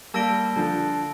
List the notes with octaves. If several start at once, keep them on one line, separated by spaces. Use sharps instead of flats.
G3 A#3 A5 E6 A#6 D7 G7
D3 F3